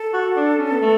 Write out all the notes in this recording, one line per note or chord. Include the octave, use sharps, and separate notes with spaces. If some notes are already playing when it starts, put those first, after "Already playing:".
Already playing: A4
F#4
D4
C#4
B3
A3